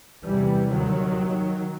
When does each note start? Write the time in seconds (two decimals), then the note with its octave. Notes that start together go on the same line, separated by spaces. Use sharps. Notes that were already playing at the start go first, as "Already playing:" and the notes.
0.24 E2 C3 E3 G3
0.71 D#2 D#3 F#3